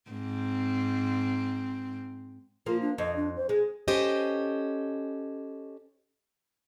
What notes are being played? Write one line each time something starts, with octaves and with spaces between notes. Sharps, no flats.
G#2 C4
F3 A#3 F4
D4
F2 D#5
D4
C5
G#3 G#4
C#4 G4 A4 C5 D#5